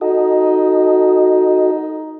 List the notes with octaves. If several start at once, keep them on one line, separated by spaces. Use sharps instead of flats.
D#4 F#4 A4 D#5